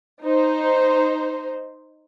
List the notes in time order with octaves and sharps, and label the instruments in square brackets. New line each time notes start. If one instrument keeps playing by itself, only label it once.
[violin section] D#4 C5